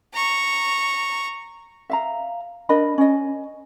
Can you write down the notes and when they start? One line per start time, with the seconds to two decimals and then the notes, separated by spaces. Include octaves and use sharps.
0.14 A#5 C#6
1.90 E5 F5 A#5
2.69 D4 A#4 D#5 B5
2.98 C#4 D#5